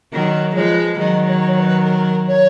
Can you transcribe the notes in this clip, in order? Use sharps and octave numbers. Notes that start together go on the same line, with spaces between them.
D#3 F#3 A#4
F3 G#3 B4 C#5
D#3 F#3 D#5
C#5
C#5
B4
A#4
C#5